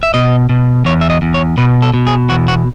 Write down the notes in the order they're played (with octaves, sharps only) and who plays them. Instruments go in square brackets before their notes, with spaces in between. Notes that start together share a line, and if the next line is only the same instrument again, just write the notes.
[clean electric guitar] E5
B2 D#5
B2
E2 C#5
E5
D#5
E2
C#5
B2 B4
A4
B2
G#4
E2 F#4
F#4